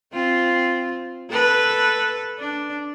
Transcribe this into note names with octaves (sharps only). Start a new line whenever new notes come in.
C4 F4
A4 B4
D4